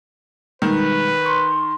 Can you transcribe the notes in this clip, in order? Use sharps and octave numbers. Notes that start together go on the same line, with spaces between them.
B2 D#3 G3 G#3 B4
C6 C#6